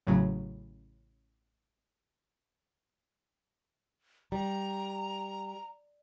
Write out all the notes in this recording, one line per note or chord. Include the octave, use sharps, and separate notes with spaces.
A1 A2 C#3 F#3
G3 A#5